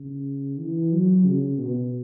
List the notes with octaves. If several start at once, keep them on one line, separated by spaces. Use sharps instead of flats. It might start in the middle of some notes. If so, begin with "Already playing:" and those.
Already playing: C#3
E3
F#3
C#3
B2